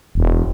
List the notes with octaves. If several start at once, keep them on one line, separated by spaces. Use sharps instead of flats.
E1